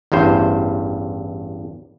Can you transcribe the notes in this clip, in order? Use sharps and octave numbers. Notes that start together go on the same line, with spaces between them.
A1 E2 G2 C5